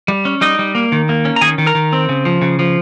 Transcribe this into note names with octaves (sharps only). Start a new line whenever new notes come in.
G3
C#4
G3 D#4 D#5
G3
A#3
D#3
A#3
C#4
A#5
D#3 G#4 G#5
D#3
A#4 A#5
D#3
C4
C#3
F3
C#3
F3